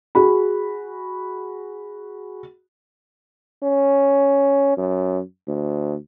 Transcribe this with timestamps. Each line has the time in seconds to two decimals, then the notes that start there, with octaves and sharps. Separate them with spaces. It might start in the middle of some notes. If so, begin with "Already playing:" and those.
0.15 F#4 G#4 B5
3.64 C#4
4.77 F#2
5.48 D2